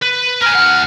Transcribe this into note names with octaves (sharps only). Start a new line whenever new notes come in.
B4
A#4 G#5 F6
D2 F#5